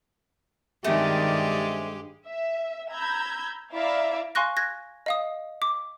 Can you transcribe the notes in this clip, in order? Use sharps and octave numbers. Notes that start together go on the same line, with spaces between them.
G2 D#3 G#3 A3 C4 C#4 G4 D5
E5
A#5 B5 E6 G6 G#6
E4 D5 E5 F5 A#5
F5 G#5 C6 C#6 F#6 A#6
F#6 G#6 A#6
D#5 F5 D#6
D6